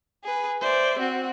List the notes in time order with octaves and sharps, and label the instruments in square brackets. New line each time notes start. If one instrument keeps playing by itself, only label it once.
[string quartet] G#4 B4
C5 D5 E5
C4 F#4